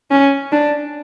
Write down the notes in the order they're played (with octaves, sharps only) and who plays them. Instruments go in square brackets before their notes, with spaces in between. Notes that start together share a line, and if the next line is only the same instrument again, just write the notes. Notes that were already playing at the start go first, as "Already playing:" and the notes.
[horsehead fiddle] C#4
D4